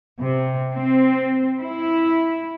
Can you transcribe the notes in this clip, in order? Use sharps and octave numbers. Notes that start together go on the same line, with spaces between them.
C3
C4
E4